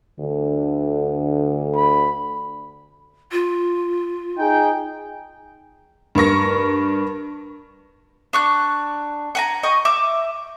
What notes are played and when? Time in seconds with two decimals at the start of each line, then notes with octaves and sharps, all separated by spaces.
0.19 D2 D3
1.76 B5
3.32 F4
4.38 D#4 G#4 G5
6.15 G2 A#4 C#6 A#6
8.33 D4 C#6 F#6
9.35 F#5 G#5 A#5
9.63 D#5 G5 C#6
9.85 E5 D6